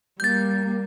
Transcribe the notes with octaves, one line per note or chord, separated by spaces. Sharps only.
G3 A#3 G6 A6